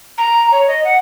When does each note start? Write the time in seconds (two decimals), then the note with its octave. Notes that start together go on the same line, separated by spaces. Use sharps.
0.18 A#5
0.52 C#5
0.68 D#5
0.84 F#5